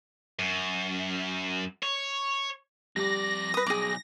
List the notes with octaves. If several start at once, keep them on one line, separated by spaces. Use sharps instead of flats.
F#2
C#5
F2 G3 D5 A#6
B4 D#6
B1 G#4 D6